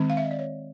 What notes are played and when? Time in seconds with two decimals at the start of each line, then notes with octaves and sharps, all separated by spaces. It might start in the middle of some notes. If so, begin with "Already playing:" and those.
Already playing: D#3 G#3 C4
0.10 F5
0.17 E5
0.24 D#5
0.31 D5
0.39 C#5